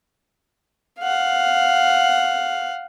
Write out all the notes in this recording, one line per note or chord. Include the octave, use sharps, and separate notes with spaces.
F5 F#5